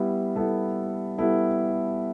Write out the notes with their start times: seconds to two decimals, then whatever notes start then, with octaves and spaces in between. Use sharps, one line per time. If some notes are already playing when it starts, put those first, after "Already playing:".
Already playing: G3 B3 E4
0.36 G3 B3 E4 A4
1.18 G3 B3 E4 A4